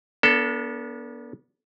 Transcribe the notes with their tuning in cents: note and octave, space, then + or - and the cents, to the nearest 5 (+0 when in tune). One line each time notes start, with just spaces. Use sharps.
B3 -40 D4 -35 A4 +5